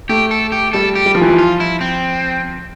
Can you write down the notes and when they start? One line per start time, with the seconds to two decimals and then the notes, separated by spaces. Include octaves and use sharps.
0.09 A3 G4
0.31 A4
0.52 G4
0.73 G3 A4
0.95 G4
1.06 G3
1.15 F3
1.21 E3
1.30 F3
1.39 F4
1.60 E4
1.81 C4